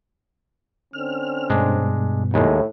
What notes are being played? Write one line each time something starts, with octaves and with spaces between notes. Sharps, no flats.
D3 C4 C#4 F6
G2 B2 G#3 D4
D#2 A2 G#3